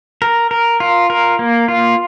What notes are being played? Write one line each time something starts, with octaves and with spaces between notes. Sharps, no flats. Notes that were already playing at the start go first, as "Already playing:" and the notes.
A#4
A#4
F4
A#4
A#3
F4